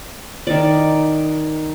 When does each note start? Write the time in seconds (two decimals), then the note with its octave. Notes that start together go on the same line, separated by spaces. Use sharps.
0.47 D#3 D5